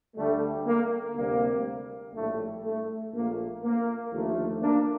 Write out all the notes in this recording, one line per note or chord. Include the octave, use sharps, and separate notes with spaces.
D2 D3 G3 A3
A#3
D2 C3 G3 A#3
A#1 A2 G3 A3
A3
A#1 A#2 F3 A3 A#3
A#3
D#2 D3 F3 A3
A#3 D4